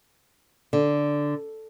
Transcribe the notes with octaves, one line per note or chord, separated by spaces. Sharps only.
D3